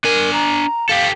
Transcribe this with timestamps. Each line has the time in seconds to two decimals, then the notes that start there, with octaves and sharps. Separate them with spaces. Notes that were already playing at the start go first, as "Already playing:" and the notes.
0.04 D4 A#4 G#5
0.33 A#5
0.89 G4 A4 F5